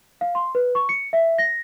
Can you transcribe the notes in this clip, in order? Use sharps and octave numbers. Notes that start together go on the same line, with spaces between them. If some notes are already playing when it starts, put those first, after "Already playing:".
F5
C6
B4
C#6
C#7
E5
A#6